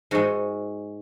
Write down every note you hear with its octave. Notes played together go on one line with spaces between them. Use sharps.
G#2 G#3 F#4